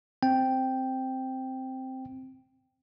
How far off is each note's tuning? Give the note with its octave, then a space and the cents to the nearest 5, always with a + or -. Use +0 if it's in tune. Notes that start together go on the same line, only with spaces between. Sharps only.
C4 +0 G5 +0